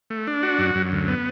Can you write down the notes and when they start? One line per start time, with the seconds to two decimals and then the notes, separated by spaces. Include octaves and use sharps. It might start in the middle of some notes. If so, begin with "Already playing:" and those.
0.10 A3
0.27 D4
0.43 F#4
0.59 F#2
0.75 F#2
0.92 D2
1.08 B3